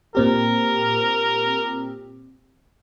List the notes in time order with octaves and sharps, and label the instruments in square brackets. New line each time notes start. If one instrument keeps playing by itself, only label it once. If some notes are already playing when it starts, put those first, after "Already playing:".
[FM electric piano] A#2 C4 G4 [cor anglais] A#4